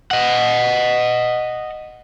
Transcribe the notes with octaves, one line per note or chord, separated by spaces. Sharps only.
D#5 F#5